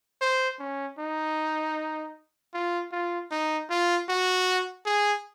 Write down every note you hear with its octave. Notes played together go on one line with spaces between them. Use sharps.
C5
C#4
D#4
F4
F4
D#4
F4
F#4
G#4